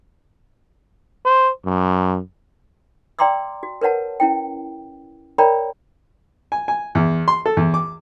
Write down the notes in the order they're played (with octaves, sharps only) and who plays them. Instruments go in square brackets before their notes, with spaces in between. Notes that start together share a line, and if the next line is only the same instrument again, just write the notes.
[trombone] C5
F#2
[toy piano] D5 G5 A#5 C6 D6 E6
F#4
A#4 B4 C#5 F#5 A5
C#4 E4 G5
A#4 C#5 D5 G5 A#5 B5
[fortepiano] G#5
G#5
E2
C6
A4
E2
D6